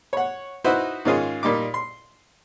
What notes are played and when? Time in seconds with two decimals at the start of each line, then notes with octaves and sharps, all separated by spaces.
0.13 C#5 F#5
0.64 D#4 E4 F#4 B4 C5
1.05 G#2 D#3 C#4 F4 G#4
1.43 A#2 G3 D#4 D6
1.74 C6